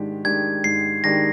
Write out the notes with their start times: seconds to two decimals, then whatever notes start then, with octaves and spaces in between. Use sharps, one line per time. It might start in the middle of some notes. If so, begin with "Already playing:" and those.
Already playing: G#2 D#3 G#3 D4 G4
0.25 D#3 G#3 D4 G4 G#6
0.64 G#2 C7
1.03 D#3 G#3 D4 G4 A#6